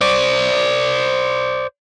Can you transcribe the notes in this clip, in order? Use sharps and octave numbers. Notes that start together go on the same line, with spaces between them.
C5 D5